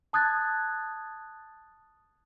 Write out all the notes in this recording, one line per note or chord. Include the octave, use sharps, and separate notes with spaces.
A5 D#6 F#6 G#6 A6